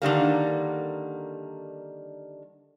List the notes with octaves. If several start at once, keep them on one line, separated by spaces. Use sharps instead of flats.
D3 D#3 G3 A#3